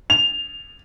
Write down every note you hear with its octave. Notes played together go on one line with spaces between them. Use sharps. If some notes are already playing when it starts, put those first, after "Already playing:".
F7